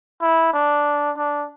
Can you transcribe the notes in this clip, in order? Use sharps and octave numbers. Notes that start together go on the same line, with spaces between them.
E4
D4
D4